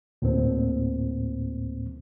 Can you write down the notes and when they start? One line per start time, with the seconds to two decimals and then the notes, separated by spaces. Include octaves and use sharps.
0.22 D2 A2 A#3 C4